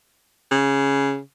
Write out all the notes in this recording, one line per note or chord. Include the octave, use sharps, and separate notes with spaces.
C#3